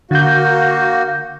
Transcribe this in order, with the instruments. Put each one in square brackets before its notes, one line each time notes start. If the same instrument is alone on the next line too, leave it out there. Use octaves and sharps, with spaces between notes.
[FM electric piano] D3 G6 [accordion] A#3 F#4